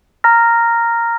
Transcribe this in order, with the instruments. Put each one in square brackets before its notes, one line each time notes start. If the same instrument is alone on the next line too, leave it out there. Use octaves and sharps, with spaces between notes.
[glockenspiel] A#5 F6 A#6